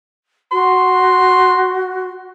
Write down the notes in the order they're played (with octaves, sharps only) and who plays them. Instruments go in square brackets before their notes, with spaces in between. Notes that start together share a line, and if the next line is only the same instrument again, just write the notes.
[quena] F#4 [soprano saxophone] C6